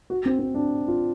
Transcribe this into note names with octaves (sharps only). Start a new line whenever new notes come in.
F#4
C4
C4
D4
F4